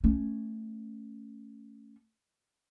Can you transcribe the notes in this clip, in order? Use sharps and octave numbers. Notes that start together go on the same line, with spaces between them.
A3 C#4